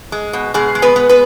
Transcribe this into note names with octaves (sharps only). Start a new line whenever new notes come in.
G#3
B2
B2 G#3 G#4
G#3
B3 B4
B3
B3 B4